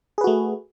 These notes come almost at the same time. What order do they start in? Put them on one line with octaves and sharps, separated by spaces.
G#4 B4 F#4 A3